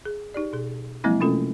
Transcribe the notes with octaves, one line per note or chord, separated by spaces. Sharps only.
G#4
D#4 G4 D5
B2 G#4
F3 F#3 G#3 A#3 C4 E4
C3 A3 C#4 F4 A4